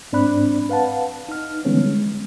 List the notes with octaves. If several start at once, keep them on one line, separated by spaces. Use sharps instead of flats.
G#2 C4 D4 D5 B5 F#6
B4 F5 F#5 A5
D#4 F6
D3 E3 G3 G#3 B3 C#4
G#3